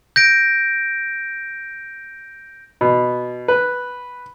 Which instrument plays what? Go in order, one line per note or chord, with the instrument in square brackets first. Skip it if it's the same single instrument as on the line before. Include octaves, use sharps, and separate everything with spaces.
[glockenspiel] G6 A#6 D7
[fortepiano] B2
B4